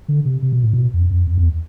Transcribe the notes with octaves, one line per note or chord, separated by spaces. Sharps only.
D3
C3
C3
B2
A2
B2
F2
F2
F2
E2